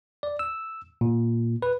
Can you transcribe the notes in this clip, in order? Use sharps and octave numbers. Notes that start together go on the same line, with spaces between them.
D5
E6
A#2
B4